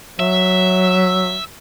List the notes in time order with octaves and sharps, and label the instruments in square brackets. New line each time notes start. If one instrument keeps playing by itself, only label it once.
[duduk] F#3 [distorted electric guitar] E5